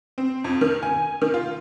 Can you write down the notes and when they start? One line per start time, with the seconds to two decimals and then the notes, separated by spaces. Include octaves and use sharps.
0.18 C4
0.44 F2
0.61 D#3
0.83 G#5
1.22 D#3
1.34 F4